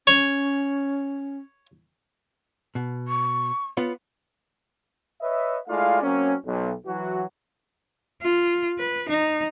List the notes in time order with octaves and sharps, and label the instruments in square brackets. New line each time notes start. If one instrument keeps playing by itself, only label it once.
[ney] C#4 [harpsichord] C#5
[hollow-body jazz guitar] B2
[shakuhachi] C#6
[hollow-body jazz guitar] B3 F4 C#5
[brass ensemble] B4 C#5 D#5 E5
G#3 A3 E4 F4 D5 F5
F#3 A#3 C4 C#4
B1
E3 F#3 F#4
[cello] F4
B4
D#4